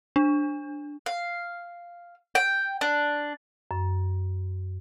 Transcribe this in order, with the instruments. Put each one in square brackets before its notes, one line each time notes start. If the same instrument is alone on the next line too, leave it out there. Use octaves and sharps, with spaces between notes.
[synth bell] D4
[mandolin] F5
G5
D4
[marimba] F#2